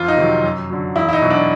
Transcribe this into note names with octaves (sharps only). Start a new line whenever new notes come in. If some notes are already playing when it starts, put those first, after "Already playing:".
Already playing: F2 F4
D#4
C3 D#3 F#3
F#2
D3 F#3
E2 E4
E4
D#4
B2 F#3
D4